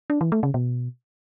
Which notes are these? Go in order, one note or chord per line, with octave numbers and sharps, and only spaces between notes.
D4
E3
A3
C#3
B2